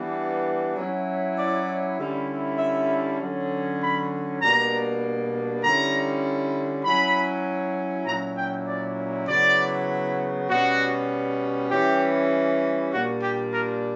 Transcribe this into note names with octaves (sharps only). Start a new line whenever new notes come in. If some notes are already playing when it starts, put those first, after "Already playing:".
Already playing: E3 G3 B3 D4
F#3 C#4 E4
D5
D3 G3 C#4 E4
E5
D3 F#3 C#4
B5
B2 G3 A#3 D4 A#5
D3 G3 C#4 E4 A#5
F#3 C#4 E4 B5
A#2 F#3 C#4 E4 A#5
G5
D5
C#3 F#3 B3 E4 D5
B2 G3 C#4 F#4
E3 G3 C#4 E4 G4
A#2 G3 A#3 D4 F#4
G4
A#4